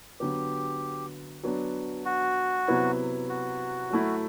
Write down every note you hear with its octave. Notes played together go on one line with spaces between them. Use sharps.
D3 F#3 B3 G4
F#3 B3 D4
F#4
C3 F#3 B3 E4
F#4
F#3 A3 E4